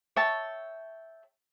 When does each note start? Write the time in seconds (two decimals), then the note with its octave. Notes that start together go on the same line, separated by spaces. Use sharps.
0.16 C#5 E5 G5 A5